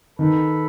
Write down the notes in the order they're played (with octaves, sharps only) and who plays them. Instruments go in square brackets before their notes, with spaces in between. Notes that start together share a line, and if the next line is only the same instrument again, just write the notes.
[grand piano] D#3 [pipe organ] A4 B4